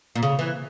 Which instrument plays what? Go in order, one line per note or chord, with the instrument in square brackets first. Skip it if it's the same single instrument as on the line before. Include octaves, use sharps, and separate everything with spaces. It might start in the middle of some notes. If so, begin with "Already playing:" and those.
[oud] A#2
C#3
E3